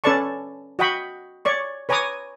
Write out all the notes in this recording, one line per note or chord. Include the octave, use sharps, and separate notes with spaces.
C#4 A4 B4 D5 A5 C#6
F#4 D#5 F#5 G5 B5 C#6
C#5 D5 C#6
B4 C#5 G#5 A#5 D6 D#6